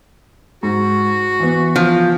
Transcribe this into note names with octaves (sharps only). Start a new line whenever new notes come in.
G#2 F#4
E3 B3
F3